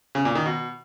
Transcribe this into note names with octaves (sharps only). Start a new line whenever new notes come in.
C#3
A#2
D#3
B2